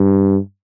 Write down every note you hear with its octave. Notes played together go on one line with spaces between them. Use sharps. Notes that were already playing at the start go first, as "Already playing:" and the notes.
Already playing: G2